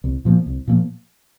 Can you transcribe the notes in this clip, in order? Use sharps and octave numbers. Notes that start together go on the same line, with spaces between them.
C2
A#2 F3 A#3
C2
A#2 F3 A#3